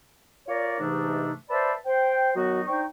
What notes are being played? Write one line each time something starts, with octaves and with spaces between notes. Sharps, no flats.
F4 A#4 C#5 D5
G#2 C3 E3 A3 D4 D#4
B4 C5 D5 E5 A5 B5
C5 G5
D#3 F#3 B3 D#4 F#4
D4 D#4 C5 G5 C#6